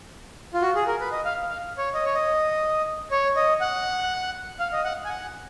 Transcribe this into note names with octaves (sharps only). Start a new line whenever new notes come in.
F4
F#4
G#4
A#4
B4
D#5
F5
F5
C#5
D#5
C#5
D#5
C#5
D#5
F#5
F5
D#5
F#5
G#5
F#5